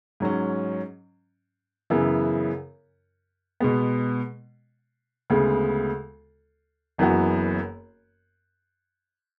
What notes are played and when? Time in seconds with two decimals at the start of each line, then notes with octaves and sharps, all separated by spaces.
0.20 G#2 F#3 C#4
1.90 F#2 C#3 E3 B3 E4
3.60 B2 G#3 B3
5.30 D2 C#3 G#3 B3
6.98 F#1 F#2 E3 B3 F#4